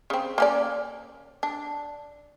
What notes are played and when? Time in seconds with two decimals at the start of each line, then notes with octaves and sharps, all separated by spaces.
0.10 C#3 C4
0.38 A#3 C#4 D5
1.43 D4